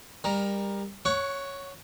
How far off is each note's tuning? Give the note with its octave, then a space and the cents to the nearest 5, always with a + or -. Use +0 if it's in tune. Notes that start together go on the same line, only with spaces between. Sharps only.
G3 +25 A#4 +10
C#5 +0 F#5 +0 C#6 +25